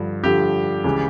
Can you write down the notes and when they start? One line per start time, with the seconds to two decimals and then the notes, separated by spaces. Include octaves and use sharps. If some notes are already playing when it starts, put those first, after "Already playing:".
Already playing: G2 D3 F3
0.23 G2 D3 F3 G4
0.84 C#2 C#3 E3